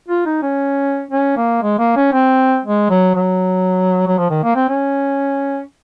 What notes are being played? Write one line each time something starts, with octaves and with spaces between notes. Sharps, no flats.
F4
D#4
C#4
C#4
A#3
G#3
A#3
C#4
C4
G#3
F#3
F#3
F#3
F3
D#3
A#3
C4
C#4